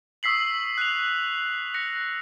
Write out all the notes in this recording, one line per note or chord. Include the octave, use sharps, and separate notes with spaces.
C#6 D#6 E6 B6 C7 F#7
F#6 F7
F#6 A#6 B6 C#7